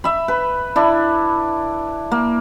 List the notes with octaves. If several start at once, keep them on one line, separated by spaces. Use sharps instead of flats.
E5 B5
B4
D4 E4
A#3